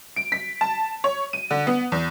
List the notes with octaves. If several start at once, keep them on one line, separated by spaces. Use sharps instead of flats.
D7
B6
A5
C#5
D#7
D3
B3
E2